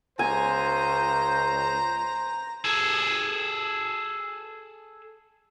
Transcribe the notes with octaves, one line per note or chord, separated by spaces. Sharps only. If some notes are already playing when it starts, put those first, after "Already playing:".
C#2 C5 G#5 A#5
G#4 A4